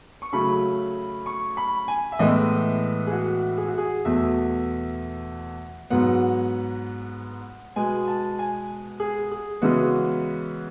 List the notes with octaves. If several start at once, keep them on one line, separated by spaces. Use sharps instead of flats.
C#6
C#3 F#3 A3 B5
C#6
B5
G#5
E5
A2 E3 G#3 B3 D#5
G#4
F#4
G#4
F#4
G#4
E2 B2 A3 E5
G#2 F#3 B3 F#5
B2 G#3 B3 G#5
A5
G#5
G#4
G#4
C#3 E3 G#3 B3 F#4